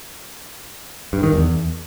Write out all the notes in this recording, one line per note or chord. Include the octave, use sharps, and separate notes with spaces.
G2
D#3
E2